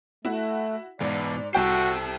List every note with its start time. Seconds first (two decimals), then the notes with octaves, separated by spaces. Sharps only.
0.25 A3 E4 F#4
1.01 E2 G#2 B2 D5
1.55 C2 F#4 A4 C5 E5 G5